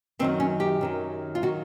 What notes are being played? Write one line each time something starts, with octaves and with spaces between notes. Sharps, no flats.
F#2 D#3 F#3 C4
C#4
G4
F#2 D#3 F#3
F4
D#3 F#3 F#4